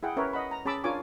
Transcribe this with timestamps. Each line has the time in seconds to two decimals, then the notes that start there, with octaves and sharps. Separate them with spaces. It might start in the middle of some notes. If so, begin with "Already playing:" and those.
0.03 E4 G#4 F#5 G5
0.17 C#4 A#4 B4 C#5 E5
0.33 D#5 F#5 B5
0.51 A#5
0.65 C#4 G#4 A5 B5 D6 E6
0.84 D4 F4 A#4 C#5 G#5 D6